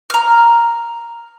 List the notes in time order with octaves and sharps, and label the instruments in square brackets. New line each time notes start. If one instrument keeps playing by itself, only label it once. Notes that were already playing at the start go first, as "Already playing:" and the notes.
[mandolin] A#5 F6